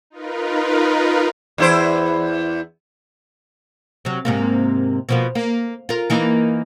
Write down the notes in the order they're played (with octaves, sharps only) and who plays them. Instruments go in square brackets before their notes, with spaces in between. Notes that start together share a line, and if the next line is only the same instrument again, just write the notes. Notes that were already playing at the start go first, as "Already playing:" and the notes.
[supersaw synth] D#4 F4 A#4 B4
[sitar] E2 E4 C5
[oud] C3 F#3
G#2 C3 A#3
B2 F3 A#3
A#3
F4 A#4
E3 A#3 D#4